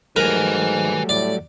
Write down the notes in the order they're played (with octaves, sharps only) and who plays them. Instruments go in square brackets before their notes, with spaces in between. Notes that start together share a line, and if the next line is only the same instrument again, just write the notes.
[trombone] G#2 [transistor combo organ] F#3 G3 A3 [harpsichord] A#4 [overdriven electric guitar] B4 G#5
[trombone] A2 [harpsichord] D5